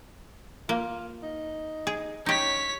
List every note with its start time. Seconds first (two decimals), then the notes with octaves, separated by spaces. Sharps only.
0.69 A#3 F4
1.23 D#4
1.87 G#4
2.26 C#4 D#4 G4 C#5 B6